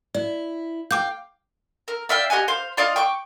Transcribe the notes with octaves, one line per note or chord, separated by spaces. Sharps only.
E4 D5
F5 G5 D6 G6
A#4
D5 E5 F5 G5
G4 D#5 F#5 G#5
C5 F5
F4 D5 D#5 F5
G5 C#6 D6